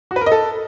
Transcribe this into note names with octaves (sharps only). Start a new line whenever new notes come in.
F#4
B4
A#4
D#5
A4